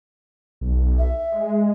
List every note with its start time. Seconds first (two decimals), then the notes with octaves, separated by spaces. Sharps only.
0.61 B1
0.99 E5
1.32 G#3